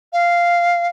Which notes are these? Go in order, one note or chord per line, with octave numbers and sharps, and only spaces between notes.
F5